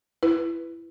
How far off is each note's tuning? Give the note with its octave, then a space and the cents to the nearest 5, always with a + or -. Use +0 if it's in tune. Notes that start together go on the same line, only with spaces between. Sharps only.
E4 +20 B4 +5